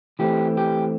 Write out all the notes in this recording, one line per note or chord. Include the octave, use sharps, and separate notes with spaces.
E3 A3 C4 G4
G4